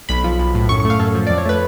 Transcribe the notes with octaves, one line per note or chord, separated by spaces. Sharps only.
B1 B5
F3
B1
A2
F#2 C#6
C#6
A3 F5
F#2 A4
F3
F2 D5
C#5
A3 B4